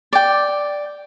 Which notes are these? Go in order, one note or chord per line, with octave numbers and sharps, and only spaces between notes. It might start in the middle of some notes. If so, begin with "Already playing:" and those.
D5 G5